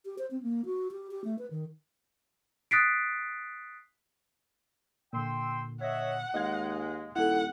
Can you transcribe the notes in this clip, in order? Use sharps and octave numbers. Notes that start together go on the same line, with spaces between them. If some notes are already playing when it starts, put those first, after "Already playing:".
G4
C5
C4
A#3
F#4
G4
G4
A3
B4
D#3
D#6 F#6 A6 B6 C7 D7
A#2 D3 G5 C6 E6
C#5 D#5 E5 F#5
D#2 G#3 D#5 F5 G#6
D#1 E4 A4 F#5